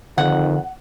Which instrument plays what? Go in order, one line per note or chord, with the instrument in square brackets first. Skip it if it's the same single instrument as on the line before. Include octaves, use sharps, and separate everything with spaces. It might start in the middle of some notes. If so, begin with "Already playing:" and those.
[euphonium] F2 [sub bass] D3 [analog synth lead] D#3 [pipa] F#5